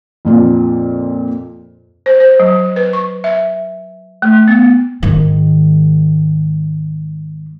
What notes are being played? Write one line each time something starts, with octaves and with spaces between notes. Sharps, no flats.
F2 A#2 F4
C5
C5
F#3
B4
C#6
E5
A3
B3
G#2 D#3